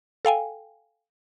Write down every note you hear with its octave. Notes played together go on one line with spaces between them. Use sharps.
A4 F5 G5 G#5